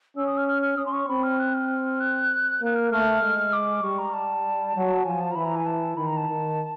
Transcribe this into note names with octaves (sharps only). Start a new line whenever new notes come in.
C#4 E6
D#6
F6
F6
F6
C#4 D#6
C6
C#6
C4 B5
F6
F#6
F6
F#6
A#3 F#6
F6
A3 F6
G#3
D6
G3 C#6
A#5
A5
F#3
F3 G#5
A5
A#5
E3 B5
A#5
G#5
A5
D#3 B5
A#5
A5
D#3